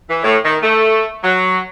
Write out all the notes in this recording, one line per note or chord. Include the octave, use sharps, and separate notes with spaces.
E3
A2
D#3
A3
F#3